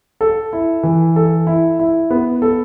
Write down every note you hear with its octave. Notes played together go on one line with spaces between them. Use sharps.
A4
E4
E3
A4
E4
E4
B3
A4